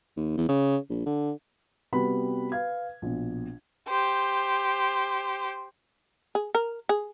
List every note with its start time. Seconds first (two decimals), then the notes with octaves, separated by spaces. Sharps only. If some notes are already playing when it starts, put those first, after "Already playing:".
0.17 D#2
0.37 E2
0.49 C#3
0.90 A#1
1.06 D3
1.93 C3 G3 B3 F#4 B4 B5
2.52 B4 F5 G#6
3.02 A#1 B2
3.88 G4 C5
6.35 G#4
6.55 A#4
6.89 G#4